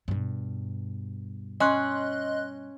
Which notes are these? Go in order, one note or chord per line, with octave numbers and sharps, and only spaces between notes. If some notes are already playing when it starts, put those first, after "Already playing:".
G2 B2
C#4 D#5 C6 F#6